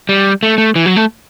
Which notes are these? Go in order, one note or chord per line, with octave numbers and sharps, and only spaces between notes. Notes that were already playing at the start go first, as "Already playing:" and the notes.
G3
A3
A3
E3
F#3
A3